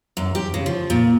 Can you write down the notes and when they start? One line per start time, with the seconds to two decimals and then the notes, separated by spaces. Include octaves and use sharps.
0.17 F#2
0.35 G4
0.54 C#3
0.66 F3
0.90 A#2